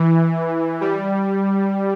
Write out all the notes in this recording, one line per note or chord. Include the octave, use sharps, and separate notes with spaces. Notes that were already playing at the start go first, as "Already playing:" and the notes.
Already playing: E3
G3